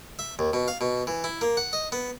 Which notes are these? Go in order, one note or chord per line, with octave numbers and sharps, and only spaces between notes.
E5
D#2
B2
F5
B2
E3
E4
A#3
F#5
D#5
B3